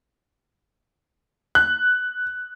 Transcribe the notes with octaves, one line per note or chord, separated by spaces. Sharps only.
F#6